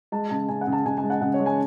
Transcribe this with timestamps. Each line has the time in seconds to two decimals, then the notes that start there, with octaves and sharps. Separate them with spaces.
0.12 G#3 A5
0.30 C#3 A5
0.49 C#3 G#5
0.61 F#5
0.67 C#3
0.72 A5
0.86 C#3 G#5
0.98 G#5
1.03 G#3
1.10 F#5
1.21 C#3 F#5
1.34 C#5
1.39 G#3
1.46 G#5